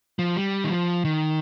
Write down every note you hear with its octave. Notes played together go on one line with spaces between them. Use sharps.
F3
G3
D#3
F3
D#3